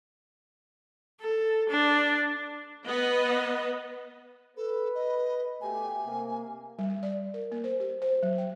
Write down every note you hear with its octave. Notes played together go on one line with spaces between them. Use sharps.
A4
D4
B3 B4 D#5
A4 B4
D#5
B2 A3 G4 G#5
C3 A#3
G3
D5
A#4
A#3
C5
G4
C5
F#3
G5